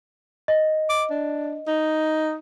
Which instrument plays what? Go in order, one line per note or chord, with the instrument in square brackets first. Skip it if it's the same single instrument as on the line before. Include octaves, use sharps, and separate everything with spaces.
[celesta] D#5
[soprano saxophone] D6
D4
D#4